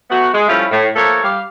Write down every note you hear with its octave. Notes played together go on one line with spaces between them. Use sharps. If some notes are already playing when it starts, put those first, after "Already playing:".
F#3 A3 B3 F#4
G#3
F3 G3 A3 C#4 E4 F4
A2
F3 A3 A#3 A4 A#4 C#5
G3 G4 F5